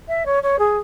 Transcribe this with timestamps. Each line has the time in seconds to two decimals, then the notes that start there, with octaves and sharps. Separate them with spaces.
0.08 E5
0.26 C#5
0.43 C#5
0.59 G#4